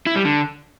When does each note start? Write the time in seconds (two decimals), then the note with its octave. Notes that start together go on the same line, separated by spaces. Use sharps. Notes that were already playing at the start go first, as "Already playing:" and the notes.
0.06 E4
0.16 G3
0.25 D3